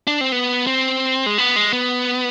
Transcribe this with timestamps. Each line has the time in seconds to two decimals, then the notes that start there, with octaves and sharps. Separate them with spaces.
0.07 D4
0.21 C4
0.32 B3
0.67 C4
1.26 G#3
1.38 B3
1.56 G#3
1.73 B3